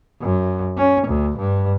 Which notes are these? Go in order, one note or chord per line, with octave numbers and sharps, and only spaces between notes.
F#2
C#4
D2
G2